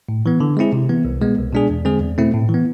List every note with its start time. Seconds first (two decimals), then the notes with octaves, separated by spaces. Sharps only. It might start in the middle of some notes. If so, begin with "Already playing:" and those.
0.09 A2
0.26 E3 B3
0.40 D3
0.57 G#3 C4 E4 G#4
0.73 C3
0.89 E3 B3
1.05 C2
1.21 B2 G#3 B3
1.38 C2
1.53 B2 G#3 D4 G#4
1.70 E2
1.85 D3 G#3 C4 G#4
2.01 E2
2.18 B2 A3 C4 E4
2.33 A2
2.49 E3
2.54 B3